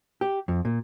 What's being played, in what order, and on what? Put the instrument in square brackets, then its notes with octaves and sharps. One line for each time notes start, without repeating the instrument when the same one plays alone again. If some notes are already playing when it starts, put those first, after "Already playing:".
[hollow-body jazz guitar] G4
F2
A#2